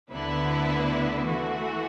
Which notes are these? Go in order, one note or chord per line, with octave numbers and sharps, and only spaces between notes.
D2 D3 B3 E4 B4
E3 A3 F#4